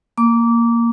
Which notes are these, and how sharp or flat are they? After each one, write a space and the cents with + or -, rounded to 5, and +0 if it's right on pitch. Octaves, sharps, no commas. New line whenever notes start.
A#3 +0 D6 -20